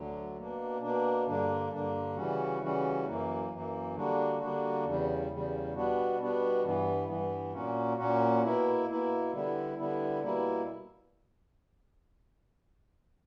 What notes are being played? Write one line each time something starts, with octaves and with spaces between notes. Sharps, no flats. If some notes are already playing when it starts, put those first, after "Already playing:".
Already playing: D2 D3 F#3
B2 A#3 D4
B2 A#3 D4
G2 D3 A#3 D4
G2 D3 A#3 D4
C#3 E3 G3 C#4 F#4
C#3 E3 G3 C#4 F#4
F#2 E3 A#3
F#2 E3 A#3
D3 G3 A#3 D4 F#4
D3 G3 A#3 D4 F#4
E2 C#3 G3
E2 C#3 G3
B2 G3 B3 D4 F#4
B2 G3 B3 D4 F#4
G2 E3 B3
G2 E3 B3
A#2 A#3 C#4 F#4
A#2 A#3 C#4 F#4
B2 A#3 E4
B2 A#3 E4
D3 G3 B3 E4
D3 G3 B3 E4
B2 G3 A#3 E4